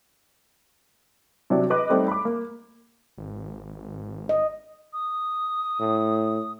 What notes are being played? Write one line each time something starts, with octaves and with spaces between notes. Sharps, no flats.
C3 F#3 D4
B4 D#5 D6 F#6
G3 A3 C4 D#4
B5 D6
A#3
G#1
D#5
D#6
A2